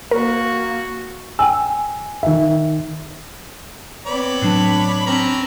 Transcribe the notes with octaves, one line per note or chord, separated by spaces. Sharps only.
A#3 F#4 A#4
G5 G#5 E6
D#3 E5
B3 C4 C#5 D5 B5
A2 F#3 D4
C4 C#4 A#5 B5